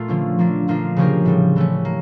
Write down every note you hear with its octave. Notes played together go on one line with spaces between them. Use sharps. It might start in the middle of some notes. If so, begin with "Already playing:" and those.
Already playing: A#2 A3 F4
D3 F3 C#4
F3 A#3 D4
A#2 F3 A#3 D4 F4
C#3 F3 C#4 G4 A#4
A2 E3 G3
E3 A3 C#4
A#3